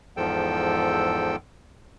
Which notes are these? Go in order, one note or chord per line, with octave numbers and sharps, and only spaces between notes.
E2 G#2 F3 A4 G5 E6